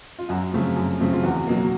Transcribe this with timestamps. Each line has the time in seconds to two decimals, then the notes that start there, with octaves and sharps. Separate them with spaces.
0.19 F4
0.29 F#2 F#4
0.52 C#3 F3 A3 C4
0.76 F#2
1.00 C#3 F3 A3 C4
1.13 F4
1.23 E2 F#4
1.47 B2 F#3 A#3